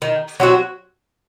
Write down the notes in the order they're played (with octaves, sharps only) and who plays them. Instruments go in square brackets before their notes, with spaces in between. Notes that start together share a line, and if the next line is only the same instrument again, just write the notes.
[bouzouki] D#3
F#3 C4 F#4